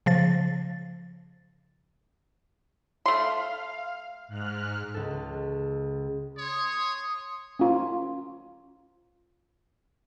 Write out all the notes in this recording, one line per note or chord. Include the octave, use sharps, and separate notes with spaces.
C#3 F3 A6
A3 F5 C6
G#2 F6 F#6
C#2 A4
C#5 C6 D#6
C#4 F4